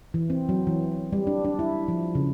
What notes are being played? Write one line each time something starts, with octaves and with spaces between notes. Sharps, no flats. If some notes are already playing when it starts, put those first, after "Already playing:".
E3
C4
F#3
E3
G3
D4
D4
E4
F3
C#3